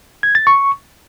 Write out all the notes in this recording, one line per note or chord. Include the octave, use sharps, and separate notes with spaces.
G#6
A6
C#6